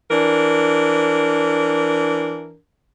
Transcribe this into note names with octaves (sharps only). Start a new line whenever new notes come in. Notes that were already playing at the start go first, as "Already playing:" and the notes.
E3 D4 A#4